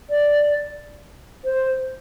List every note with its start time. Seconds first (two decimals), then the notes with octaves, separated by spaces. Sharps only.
0.10 D5
1.45 C5